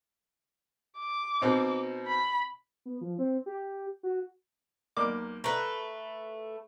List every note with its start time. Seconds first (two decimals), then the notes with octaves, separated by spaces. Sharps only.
0.98 D6
1.41 B2 C4 D#4
2.07 B5
2.85 B3
3.01 F3
3.18 C4
3.46 G4
4.03 F#4
4.97 B1 A#3 D6
5.44 A3 B4 A#5